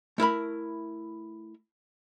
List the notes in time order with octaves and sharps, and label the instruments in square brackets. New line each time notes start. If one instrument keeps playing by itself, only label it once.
[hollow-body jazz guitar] A3 E4 A#4 B5